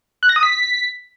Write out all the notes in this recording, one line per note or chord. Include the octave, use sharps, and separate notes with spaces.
F#6
A#6
D#6
B6